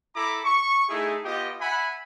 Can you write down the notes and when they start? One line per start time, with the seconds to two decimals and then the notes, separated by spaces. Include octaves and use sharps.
0.16 E4 A4 A#5 B5 D6
0.45 C#6
0.89 A3 D#4 E4 G#4
1.24 B3 F4 G4 D#5 G5
1.61 E5 F#5 G#5 B5